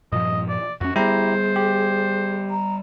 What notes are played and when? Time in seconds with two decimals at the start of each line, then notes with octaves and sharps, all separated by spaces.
0.12 G2 A#2 F3 D#5
0.49 D5
0.81 F2 C#4 F#4
0.96 G3 B3 E4 G4 G#4 C5 A#5
1.56 G4
2.51 A#5